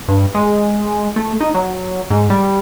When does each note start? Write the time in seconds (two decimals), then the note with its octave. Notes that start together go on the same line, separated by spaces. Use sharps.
0.08 G2
0.35 G#3
1.16 A3
1.40 D#4
1.54 F#3
2.10 G#2
2.30 G3